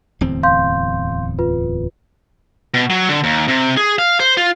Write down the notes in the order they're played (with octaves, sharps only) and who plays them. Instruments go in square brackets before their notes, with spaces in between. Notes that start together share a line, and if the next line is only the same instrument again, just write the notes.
[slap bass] D1 E2 C4
[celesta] F5 C6 G6
F4 B4
[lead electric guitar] B2
F#3
D3
D#2
C3
G#4
F5
C5
F4